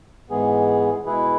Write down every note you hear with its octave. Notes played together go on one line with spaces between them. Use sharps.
G#2 E3 G#3 B3 G#4
B2 G#3 E4 G#4 B4